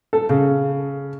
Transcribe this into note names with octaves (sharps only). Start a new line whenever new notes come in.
A4
C#3